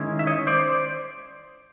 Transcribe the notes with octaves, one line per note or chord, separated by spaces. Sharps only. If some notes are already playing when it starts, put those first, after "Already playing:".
Already playing: D#3 G#3 C#4 E4
E5
C#5 D#5
C5 D5